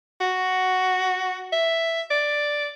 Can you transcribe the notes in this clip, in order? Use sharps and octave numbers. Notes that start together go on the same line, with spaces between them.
F#4
E5
D5